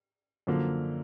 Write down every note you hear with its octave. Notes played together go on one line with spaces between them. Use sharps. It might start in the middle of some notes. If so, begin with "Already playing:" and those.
F#2 D3 F3 A#3